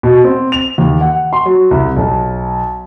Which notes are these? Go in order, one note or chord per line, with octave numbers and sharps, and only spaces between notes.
B2
C4
F7
D#2
F#5
C6
F#3
C2
B1